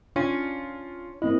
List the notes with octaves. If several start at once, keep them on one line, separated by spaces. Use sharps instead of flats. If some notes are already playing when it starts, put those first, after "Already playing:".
C#4 D4 F4
A#3 C4 E4 D#5